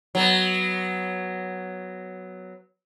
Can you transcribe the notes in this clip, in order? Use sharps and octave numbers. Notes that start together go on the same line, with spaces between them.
F#3 B3